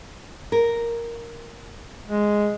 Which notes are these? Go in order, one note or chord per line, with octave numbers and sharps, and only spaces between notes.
A#4
G#3